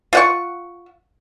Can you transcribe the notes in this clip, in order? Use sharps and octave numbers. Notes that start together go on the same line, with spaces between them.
F4 F#5 C#6